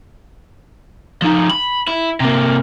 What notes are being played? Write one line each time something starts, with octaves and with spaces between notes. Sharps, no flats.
F3 D#4
B5
E4
C3 A#3